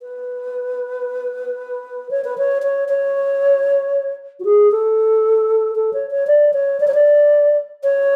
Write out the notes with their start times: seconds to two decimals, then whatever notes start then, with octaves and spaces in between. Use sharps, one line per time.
0.02 B4
2.11 C#5
2.24 B4
2.38 C#5
2.62 C#5
2.88 C#5
4.40 F#4
4.45 G#4
4.71 A4
5.75 A4
5.93 C#5
6.11 C#5
6.27 D5
6.53 C#5
6.80 D5
6.87 C#5
6.94 D5
7.83 C#5